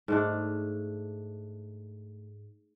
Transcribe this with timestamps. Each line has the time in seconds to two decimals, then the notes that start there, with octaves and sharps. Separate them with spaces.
0.08 G#2 A3 D4